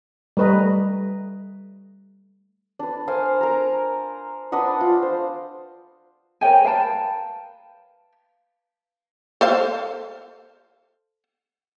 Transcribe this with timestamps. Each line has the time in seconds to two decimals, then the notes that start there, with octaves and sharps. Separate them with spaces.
0.37 G3 A3 B4 D#5 A#5
2.79 D4 B4
3.07 A#4 C5 F5 G#5
3.41 A#4 A#5
4.52 D4 B4 D#5 F#5
4.81 F4
5.02 C5
6.41 A#4 C#5 G5 G#5
6.64 B4 F5 G5 A5
9.41 A4 C5 F5